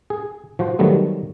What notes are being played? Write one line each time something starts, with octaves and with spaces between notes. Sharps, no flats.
G#4
F3 F#4 C5
D#3 F#3 G3 A3 B3